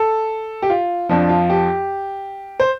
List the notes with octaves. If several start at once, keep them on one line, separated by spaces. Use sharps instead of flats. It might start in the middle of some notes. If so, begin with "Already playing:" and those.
Already playing: A4
G4
F4
F2 F3 D4
F4
G4
C5